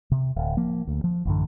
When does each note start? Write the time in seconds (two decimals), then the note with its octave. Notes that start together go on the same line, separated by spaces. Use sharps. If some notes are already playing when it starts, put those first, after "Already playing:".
0.12 C3
0.36 D1
0.57 F3 A#3
0.87 D2
1.04 F3
1.25 A1 F#2 D3